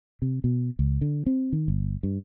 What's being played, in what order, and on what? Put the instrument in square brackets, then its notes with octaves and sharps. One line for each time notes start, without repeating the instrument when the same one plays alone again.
[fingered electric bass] C3
B2
C#2
D3
C4
D#3
G1
G2